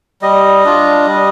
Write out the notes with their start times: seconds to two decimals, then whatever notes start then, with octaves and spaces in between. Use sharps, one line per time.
0.22 G3 D#5
0.65 D4 F4
1.07 G3